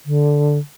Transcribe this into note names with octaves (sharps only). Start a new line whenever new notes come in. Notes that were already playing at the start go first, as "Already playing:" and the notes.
D3